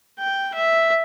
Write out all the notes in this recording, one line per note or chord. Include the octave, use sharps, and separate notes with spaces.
G5
E5